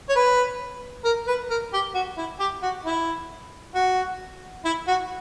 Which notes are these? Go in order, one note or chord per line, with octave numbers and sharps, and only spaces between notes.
C#5
B4
A#4
B4
A#4
G4
F#4
E4
G4
F#4
E4
F#4
E4
F#4